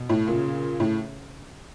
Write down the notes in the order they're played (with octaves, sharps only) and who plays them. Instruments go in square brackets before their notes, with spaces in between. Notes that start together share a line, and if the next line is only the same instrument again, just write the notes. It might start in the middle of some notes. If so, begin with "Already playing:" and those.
Already playing: [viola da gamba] B2
[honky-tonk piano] A2
[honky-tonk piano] A#2 [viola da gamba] C#3
[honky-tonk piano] A2